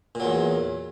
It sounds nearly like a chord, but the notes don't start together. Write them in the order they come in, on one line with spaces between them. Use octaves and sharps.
A#2 F#3 E2